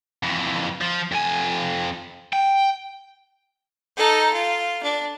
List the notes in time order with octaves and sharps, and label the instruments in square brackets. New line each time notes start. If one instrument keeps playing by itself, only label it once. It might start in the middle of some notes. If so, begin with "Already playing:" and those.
[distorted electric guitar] F2 E3
F3
F2 G#5
G5
[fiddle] D#4 A4
F4
D4